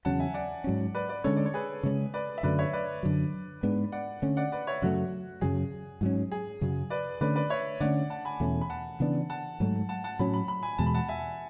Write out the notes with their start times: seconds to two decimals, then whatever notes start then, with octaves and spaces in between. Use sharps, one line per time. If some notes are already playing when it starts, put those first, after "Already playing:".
0.05 E2 C#3 F#3 C#4 F#5 A5
0.20 E5 G#5
0.34 D5 F#5
0.64 G#2 F#3 C#4
0.95 B4 D5
1.09 B4 D5
1.24 D3 G#3 C#4 A4 C#5
1.37 D5
1.46 C#5
1.54 G#4 B4
1.83 C#3 G#3 C#4
2.14 B4 D5
2.38 E5
2.43 F#2 D3 F#3 A3 B4 D5
2.59 C#5 E5
2.73 B4 D5
3.03 F#2 D3 F#3
3.63 G#2 G#3 B3 D4
3.92 D5 F#5
4.22 D3 A3 C#4
4.37 D5 F#5
4.52 B4 D5
4.67 C#5 E5
4.82 F#2 C#3 F#3 A3 F#4
5.41 F#2 C#3 F#3 G#4
6.01 G#2 F#3 C#4
6.32 G#4
6.61 F#2 C#3 F#3
6.90 B4 D5
7.21 D3 A3 C#4 B4 D5
7.36 B4 D5
7.50 C#5 E5
7.80 D3 A3 C#4 D5 F#5
8.10 F#5 A5
8.25 G#5 B5
8.40 E2 B2 A3 C#4
8.61 B5
8.70 F#5 A5
9.00 C#3 E3 B3 D4
9.30 F#5 A5
9.60 G#2 F#3 A3
9.89 F#5 A5
10.04 F#5 A5
10.19 A2 F#3 C#4 B5
10.34 B5
10.48 B5
10.63 G#5 B5
10.78 E2 B2 G#3 A5
10.86 B5
10.94 F#5 A5
11.09 E5 G#5